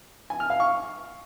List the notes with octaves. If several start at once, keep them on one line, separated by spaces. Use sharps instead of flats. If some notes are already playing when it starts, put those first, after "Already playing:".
G#5
F6
F5
C#6